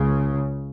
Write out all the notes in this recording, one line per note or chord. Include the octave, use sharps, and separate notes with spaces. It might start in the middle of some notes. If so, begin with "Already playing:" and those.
Already playing: C#2 C#3